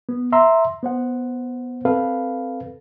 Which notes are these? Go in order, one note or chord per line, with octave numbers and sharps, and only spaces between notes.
B3
E5 A#5 C6 E6
B3 C5 F#5
C4 A4 B4 F5